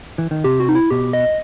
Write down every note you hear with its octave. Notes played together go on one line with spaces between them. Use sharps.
E3
D#3
C3 G4
F#4
D#4
E4
B2 G4
D#5